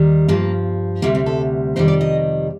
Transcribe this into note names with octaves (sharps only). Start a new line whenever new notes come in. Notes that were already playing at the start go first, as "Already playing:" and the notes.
Already playing: D#2 D#3 G3
G2 F3 A#3
D2 C3 G3 A#3
C4
A4
F2 C3 D#3 G3 C5
D5
D#5